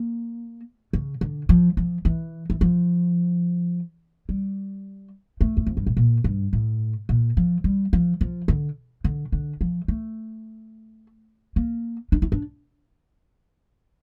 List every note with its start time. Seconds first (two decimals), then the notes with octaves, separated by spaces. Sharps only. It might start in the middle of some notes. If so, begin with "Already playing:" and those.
Already playing: A#3
0.93 C#3
1.21 D3
1.49 F3
1.77 F3
2.05 E3
2.50 E3
2.61 F3
4.29 G3
5.41 A3
5.57 E2
5.67 F2
5.77 G2
5.87 A2
5.97 A#2
6.24 G2
6.53 A2
7.09 A#2
7.37 F3
7.64 G3
7.93 F3
8.21 F3
8.48 D3
9.04 D3
9.32 D3
9.61 F3
9.88 A3
11.56 A#3
12.12 D4
12.22 E4
12.32 D4